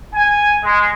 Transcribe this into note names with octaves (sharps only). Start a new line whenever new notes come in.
G#5
G#3